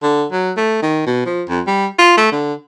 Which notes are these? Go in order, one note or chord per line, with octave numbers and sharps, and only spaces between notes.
D3
F#3
A3
D#3
B2
F3
F2
G3
F4
A3
D3